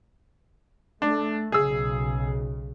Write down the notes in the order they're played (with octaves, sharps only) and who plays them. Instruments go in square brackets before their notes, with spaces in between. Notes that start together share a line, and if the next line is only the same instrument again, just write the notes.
[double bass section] A3 [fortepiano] D4
[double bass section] B1 C#3 [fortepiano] G#4 E6